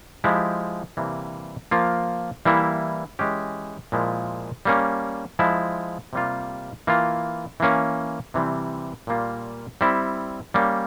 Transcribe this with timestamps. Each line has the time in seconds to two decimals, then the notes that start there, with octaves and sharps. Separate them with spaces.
0.24 F3 G#3 E4 G4
0.97 C3 E3 G3 A#3
1.71 F3 A#3 F4
2.45 E3 G3 A#3 E4
3.19 E3 G#3 C#4 G4
3.92 A#2 F3 G#3 E4
4.65 G3 A#3 C#4
5.39 F3 G#3 E4
6.13 C3 G3 A#3 F4
6.87 E3 A#3 F4
7.60 E3 A#3 C#4
8.34 C3 E3 G3 C4
9.07 A#2 G3 A#3 F4
9.81 G3 C4 E4
10.54 G3 A#3 C#4